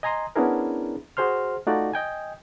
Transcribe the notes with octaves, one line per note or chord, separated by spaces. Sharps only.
D#5 G#5 A#5 C6 D#6
B3 C#4 D4 E4 G#4 A#4
F#4 G#4 C5 C6 F6
A3 D#4 F4 F#4 D5
D#5 G5 G#5